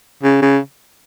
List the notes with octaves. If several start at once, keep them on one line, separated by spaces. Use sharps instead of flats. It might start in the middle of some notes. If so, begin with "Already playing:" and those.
C#3
C#3